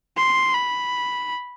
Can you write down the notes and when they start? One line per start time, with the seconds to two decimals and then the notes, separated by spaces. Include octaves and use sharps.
0.18 C6
0.54 B5